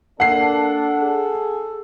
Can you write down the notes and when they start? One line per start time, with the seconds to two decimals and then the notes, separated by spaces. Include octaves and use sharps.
0.20 A#3 D4 A4 F#5 C7
1.02 G#4